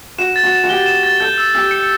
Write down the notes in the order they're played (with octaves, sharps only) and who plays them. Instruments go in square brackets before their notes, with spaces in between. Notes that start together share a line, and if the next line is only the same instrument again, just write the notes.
[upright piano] F#4 [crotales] E7
[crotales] A6
[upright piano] F#4
[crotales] A6
[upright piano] F#4
[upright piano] G4 [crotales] G7
[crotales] E7
A6
[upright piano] A4 [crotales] G6
[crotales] E6
[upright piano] G4 [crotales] E6
[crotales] C#7